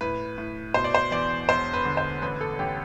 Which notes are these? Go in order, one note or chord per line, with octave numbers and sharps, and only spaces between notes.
A2 B4
A2
B2 C5
D5
C5
E2 D5
E1 C5
B4
D3
C5
A1 B4
A4
A1 G4